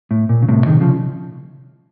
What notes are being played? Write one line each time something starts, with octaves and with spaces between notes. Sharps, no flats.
A2
A#2
C#3
A2 C3
C3 D#3
C#3 F3